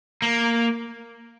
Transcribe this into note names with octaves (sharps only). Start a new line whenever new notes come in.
A#3